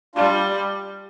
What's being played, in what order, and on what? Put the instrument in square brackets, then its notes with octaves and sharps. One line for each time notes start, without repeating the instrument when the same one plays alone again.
[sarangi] G3 [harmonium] D4 F4